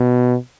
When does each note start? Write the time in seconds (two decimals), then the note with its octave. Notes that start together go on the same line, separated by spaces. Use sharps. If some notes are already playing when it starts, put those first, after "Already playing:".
Already playing: B2